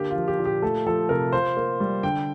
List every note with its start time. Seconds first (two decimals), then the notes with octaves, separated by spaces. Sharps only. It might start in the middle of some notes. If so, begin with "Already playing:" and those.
Already playing: D3 A#3 G4
0.10 F4
0.16 F3
0.28 G4
0.39 A#2
0.45 G4
0.62 A3 A4
0.86 F3 A4
1.09 C3 A#4
1.33 F4 C5
1.57 A#3
1.80 G3
2.03 D3 G5